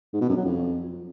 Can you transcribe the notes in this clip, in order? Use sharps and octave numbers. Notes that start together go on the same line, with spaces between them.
G#2
B2
F#2
F#3
F2